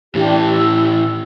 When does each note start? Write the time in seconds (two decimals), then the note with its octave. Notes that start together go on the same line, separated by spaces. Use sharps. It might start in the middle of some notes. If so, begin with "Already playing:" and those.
0.15 A2 E3 D4 G4
0.46 E6